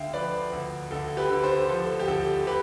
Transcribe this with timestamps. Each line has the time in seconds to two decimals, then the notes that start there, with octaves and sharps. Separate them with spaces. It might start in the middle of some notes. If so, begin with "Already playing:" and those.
Already playing: D2 D3 E5 F5 G5
0.13 F3 B4 D5
0.53 D2
0.91 D2 A4
1.17 G4 B4
1.30 D3
1.43 A4 C5
1.69 F3 A4
1.99 G4
2.08 D2 A4
2.47 G4 B4